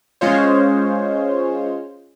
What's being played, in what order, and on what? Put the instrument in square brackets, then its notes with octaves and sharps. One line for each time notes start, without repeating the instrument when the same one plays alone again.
[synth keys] G#3 C#4 F4 C5 C#5